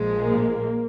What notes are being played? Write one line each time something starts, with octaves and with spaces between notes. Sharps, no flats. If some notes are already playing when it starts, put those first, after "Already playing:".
Already playing: A#1 A#2 F3 G#3
A#3